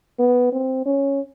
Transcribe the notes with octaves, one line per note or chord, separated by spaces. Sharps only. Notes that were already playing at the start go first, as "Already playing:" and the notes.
B3
C4
C#4